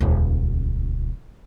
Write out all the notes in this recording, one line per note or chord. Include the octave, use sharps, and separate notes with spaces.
D#1 C#2